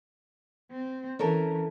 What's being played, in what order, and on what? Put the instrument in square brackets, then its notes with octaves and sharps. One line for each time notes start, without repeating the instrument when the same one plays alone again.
[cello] C4
[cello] E3 [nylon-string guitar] C#4 A4 A#4